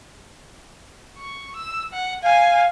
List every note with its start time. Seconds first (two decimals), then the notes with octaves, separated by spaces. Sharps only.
1.18 C#6
1.56 E6
1.93 F#5
2.23 F5 G#5